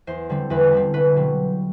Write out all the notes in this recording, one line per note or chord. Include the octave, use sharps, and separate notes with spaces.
E2 C5
D3 G3 C4
E2 B4
D3 G3 C4
C2 B4
B2 F#3 C4